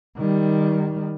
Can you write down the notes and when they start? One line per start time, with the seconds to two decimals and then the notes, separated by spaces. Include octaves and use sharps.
0.17 D#3 G3